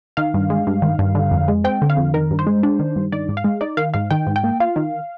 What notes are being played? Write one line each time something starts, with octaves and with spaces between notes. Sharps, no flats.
D#3 F5
G2
G#3
G2
D#3
G2
D3
F2
G#3
C4 G5
D3
F5
F2
D#3 A#4
G2
C5
G#3
D4
D#3
G2
D#3 D5
G#2
F5
G#3
D#4 D5
D#3 F5
G#2 F5
D#3 G5
G#2
G5
A#3
F4 F5
D#3